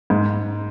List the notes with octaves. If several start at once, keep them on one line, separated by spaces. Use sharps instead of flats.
G#2